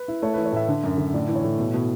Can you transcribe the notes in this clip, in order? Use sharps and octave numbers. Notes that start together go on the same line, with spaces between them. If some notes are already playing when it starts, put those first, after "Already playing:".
Already playing: B4
E4
A3 C#5
E3 B4
C#5
A2 E5
D3
F#2
D3
A2 D5
E3
C#5
A2
B2
B2